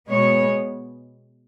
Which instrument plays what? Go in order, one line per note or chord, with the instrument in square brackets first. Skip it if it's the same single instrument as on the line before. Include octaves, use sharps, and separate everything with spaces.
[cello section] B2 G#3 B3 C#5